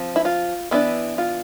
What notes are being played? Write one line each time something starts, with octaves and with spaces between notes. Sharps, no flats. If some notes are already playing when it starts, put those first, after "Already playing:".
Already playing: F3 C4
E4
F4
E3 B3 D4 E4
F4